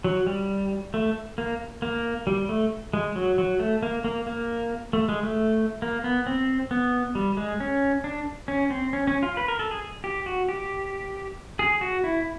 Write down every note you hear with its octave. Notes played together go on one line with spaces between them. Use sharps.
F#3
G3
A3
A#3
A#3
G3
A3
G#3
F#3
F#3
A3
A#3
A#3
A#3
A3
G#3
A3
A#3
B3
C4
B3
G3
G#3
C#4
D4
C#4
C4
C#4
C#4
F4
B4
A#4
A4
G#4
G4
F#4
G4
G#4
F#4
E4